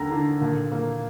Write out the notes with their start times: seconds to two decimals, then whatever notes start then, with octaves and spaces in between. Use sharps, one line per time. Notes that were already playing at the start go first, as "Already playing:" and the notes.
Already playing: D#2 D3 A3 A#5
0.11 D3
0.41 A#2
0.72 A#3